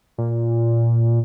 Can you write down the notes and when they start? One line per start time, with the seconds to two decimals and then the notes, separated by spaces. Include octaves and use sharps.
0.18 A#2